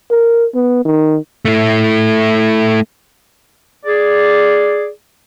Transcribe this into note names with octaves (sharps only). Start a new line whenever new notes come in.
A#4
B3
D#3
A3 E4
G#4 D5